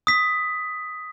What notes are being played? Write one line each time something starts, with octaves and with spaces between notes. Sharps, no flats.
D#6 B6